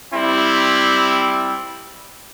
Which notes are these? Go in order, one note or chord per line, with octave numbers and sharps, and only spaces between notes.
G3 C4 E4